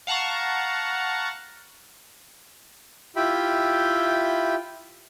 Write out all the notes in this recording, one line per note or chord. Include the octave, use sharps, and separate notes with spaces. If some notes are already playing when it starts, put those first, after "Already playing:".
F5 F#5 A5 A#5 C#6
E4 F4 G4 E5 G5 B5